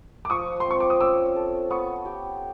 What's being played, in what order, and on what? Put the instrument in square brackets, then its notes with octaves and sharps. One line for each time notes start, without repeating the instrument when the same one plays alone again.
[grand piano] D6
[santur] F3 [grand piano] C#6 D#6
[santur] C4 [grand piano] C6
[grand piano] C#6
D6
D#6
[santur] C#4 [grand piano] D6 E6
[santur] A4
[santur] B3 [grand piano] C#6 D#6
[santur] G4